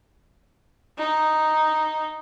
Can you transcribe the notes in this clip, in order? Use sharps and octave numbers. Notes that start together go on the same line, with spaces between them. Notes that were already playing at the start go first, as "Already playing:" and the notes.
D#4